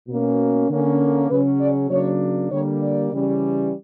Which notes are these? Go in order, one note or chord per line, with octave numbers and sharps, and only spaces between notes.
B2 A#3 C#4
D3 A#3 C#4
C#3 F#3 C#4 B4
D5
C#3 F#3 A#3 D4 C#5
D3 G3 A#3 C#5
D5
C#3 E3 G3 C#4